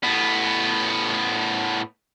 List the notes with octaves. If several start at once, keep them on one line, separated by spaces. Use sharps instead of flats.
A2 B3